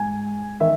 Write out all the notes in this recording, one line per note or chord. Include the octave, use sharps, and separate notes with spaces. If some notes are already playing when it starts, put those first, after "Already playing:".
Already playing: G#2 G#5
D#3 E5